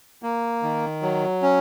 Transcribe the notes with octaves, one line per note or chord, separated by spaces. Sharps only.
A#3
D#3
F#3
C#4